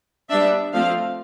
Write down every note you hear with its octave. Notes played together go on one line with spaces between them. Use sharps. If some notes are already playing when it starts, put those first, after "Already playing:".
G3 B3 D4 E5
F3 A3 C4 F5